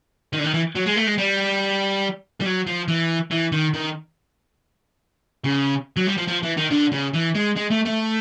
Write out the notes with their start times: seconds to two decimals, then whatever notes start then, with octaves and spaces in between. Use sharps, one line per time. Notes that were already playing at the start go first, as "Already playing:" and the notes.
0.33 D#3
0.39 D3
0.44 D#3
0.54 E3
0.76 F#3
0.86 G#3
0.96 A3
1.07 G#3
1.18 G3
2.40 G3
2.45 F#3
2.67 F3
2.88 E3
3.31 E3
3.52 D#3
3.74 D#3
5.44 C#3
5.97 F#3
6.07 G3
6.18 F3
6.28 F3
6.43 E3
6.57 D#3
6.71 D3
6.92 C#3
7.14 E3
7.35 G#3
7.56 G#3
7.70 A3
7.85 A3